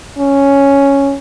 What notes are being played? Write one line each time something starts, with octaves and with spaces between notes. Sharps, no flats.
C#4